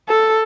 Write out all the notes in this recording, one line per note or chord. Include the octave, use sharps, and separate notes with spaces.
A4